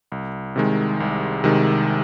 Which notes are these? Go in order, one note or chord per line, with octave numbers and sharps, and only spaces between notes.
C2
C3 D#3 G#3
C2
C3 D#3 G#3